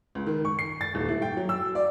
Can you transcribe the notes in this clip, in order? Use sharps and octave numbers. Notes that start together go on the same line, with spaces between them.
C#2
D#3
C#6
C7
A6
D#1
E4
G5
F#3
E6
D5